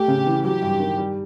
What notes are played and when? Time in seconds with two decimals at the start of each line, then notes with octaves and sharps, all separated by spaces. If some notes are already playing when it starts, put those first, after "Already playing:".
Already playing: A3 G4
0.08 C#3
0.26 E3
0.44 F#3 G4
0.62 G2
0.79 D#3
0.97 G3